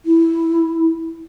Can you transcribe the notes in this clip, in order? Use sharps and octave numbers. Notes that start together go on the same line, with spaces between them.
E4